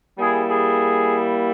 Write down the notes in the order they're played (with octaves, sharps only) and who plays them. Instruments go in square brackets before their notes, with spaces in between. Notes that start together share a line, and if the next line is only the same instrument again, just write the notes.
[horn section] G3 A#3 E4 G#4
G#4